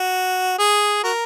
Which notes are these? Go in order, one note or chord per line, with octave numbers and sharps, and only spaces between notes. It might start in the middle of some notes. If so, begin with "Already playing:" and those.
Already playing: F#4
G#4
F#4 A#4